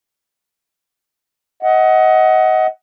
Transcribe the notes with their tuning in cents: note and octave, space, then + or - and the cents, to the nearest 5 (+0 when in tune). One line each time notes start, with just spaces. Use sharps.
D#5 +25 F#5 +10